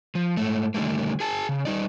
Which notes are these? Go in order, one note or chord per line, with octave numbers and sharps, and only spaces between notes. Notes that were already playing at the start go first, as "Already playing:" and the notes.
F3
G#2 A3
D3 D#3 G3 A3 A#3
G#4 G#5 A5
C#3
G3 D#4 D5